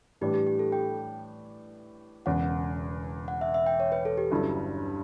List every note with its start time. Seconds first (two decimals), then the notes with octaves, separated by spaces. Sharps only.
0.21 A2 E3 G3 D4 G4
0.34 G4
0.47 G4
0.59 A4
0.72 G5
2.26 E1 E2 C#3 F#5
3.28 F#5
3.41 E5
3.54 E5
3.66 G5
3.80 C#5
3.92 B4
4.05 A4
4.18 G4
4.31 G1 G2 F#3 C#4 E4